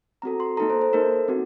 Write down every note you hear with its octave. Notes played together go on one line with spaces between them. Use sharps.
C4 F#4 A4 A#5
C6
A#3 D#4 A4 A#5
C5
C5
A#3 D#4 A4 A#4
C4 F#4